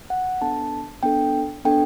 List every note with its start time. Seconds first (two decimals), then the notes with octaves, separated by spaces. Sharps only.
0.10 F#5
0.41 B3 D4 A4 A5
1.03 B3 D4 A4 G5
1.65 B3 D4 A4 G5